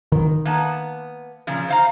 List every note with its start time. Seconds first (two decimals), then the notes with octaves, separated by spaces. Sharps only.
0.12 D#3
0.45 A#3 B3 A5
1.47 A#2 C#3 F3
1.68 C5 F5 A#5